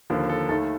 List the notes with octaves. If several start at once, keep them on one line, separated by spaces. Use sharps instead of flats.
D#2 D3 F3 A#3
A4
D#2 D#3 A3 A4